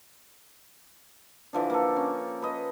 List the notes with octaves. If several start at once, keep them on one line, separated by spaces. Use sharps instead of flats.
D3 E3 F3 D4
A#3 A4
C#4
B4 D#5